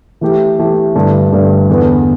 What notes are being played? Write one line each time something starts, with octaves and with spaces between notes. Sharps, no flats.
E3 A3 G4
E3 A3 G4
G2 D3 A3 D4
G2 D3 A3 D4
E2 D3 B3